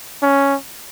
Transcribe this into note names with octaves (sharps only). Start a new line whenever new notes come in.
C#4